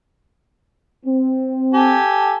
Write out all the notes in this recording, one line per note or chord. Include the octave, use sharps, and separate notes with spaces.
C4
G4 A4 G#5